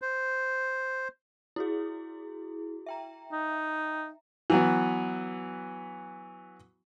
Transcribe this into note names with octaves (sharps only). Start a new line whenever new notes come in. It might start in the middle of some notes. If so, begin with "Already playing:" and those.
C5
E4 F#4 G#4
E5 G5 A#5
D#4
E3 F#3 B3